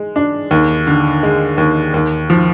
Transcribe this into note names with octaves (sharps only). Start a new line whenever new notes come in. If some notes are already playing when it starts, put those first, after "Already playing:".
Already playing: G#3
D4
D#2
D3
G#3
D#2
D#2
F3